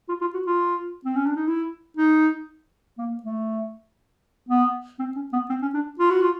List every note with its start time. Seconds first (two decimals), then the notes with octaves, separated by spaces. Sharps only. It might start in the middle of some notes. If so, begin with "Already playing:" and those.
0.09 F4
0.21 F4
0.34 F#4
0.46 F4
1.05 C4
1.15 C#4
1.26 D4
1.36 D#4
1.47 E4
1.97 D#4
2.98 A#3
3.23 A3
4.49 B3
4.99 C4
5.16 C#4
5.33 B3
5.49 C4
5.62 C#4
5.74 D4
5.99 F4
6.10 F#4
6.22 F4